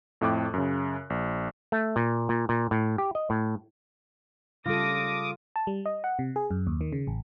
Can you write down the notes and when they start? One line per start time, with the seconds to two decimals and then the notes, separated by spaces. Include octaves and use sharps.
0.21 F2 A2 G5 D6 F#6
0.54 F#2 C#3
1.10 A#1
1.72 A3
1.96 A#2
2.29 A#2
2.49 A#2
2.71 A2
2.98 G4
3.15 D#5
3.30 A2
4.66 C#3 G3 F4 A4 D6 D#6 A#6
5.56 A5
5.67 G3
5.86 D#5
6.04 F#5
6.19 C3
6.36 G#4
6.51 F#2
6.67 D#2
6.81 D#3
6.92 C#3
7.07 A1